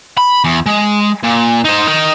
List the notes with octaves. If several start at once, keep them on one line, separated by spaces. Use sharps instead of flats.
B5
E2
G#3
A#2
D#4 C5
D#4 A#4